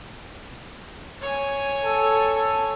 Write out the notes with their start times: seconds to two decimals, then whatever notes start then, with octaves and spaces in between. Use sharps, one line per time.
1.21 C#5 G#5
1.85 A4